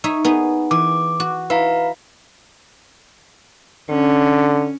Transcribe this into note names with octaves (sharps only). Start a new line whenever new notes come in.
D#4 C#5 E5
B3 D#4 G#4
E3 D6
F#4
E4 B4 F5 A#5
D3 C#4